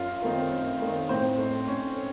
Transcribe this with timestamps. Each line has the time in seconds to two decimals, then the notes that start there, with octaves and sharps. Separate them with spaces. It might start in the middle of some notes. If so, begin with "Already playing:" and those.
Already playing: F#2 F4
0.22 D#3 A3 C4 D#4
0.51 F#2
0.80 D#3 A3 C4 D#4
1.09 A2 C4 C5
1.38 A3 D#4
1.68 A2 C#4 C#5
1.97 A3